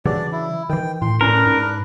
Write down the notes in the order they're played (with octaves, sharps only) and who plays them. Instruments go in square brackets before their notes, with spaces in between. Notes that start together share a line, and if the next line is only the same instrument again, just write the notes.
[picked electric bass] C#3 E3 F#3 [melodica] D4 D5
[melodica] E4
[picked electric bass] D#3 E3 [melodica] G5
[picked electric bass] A2 [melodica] C6
[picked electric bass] A2 C#4 [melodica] D4 B4 [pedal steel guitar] A#4
[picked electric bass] G#2